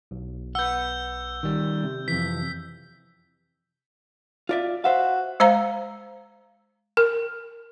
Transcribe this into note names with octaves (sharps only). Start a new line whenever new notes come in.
B1
B4 F#5 E6 G6
D#3 G3
C3
F2 E3 B6
F4 D5 E5
F#4 C5 E5 F5
G#3 C5 F5 A#5
A#4